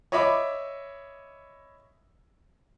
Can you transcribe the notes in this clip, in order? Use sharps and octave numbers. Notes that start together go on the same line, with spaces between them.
C#5 D#5 E5 B5 D6